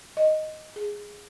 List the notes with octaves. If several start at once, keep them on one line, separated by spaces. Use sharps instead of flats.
D#5
G#4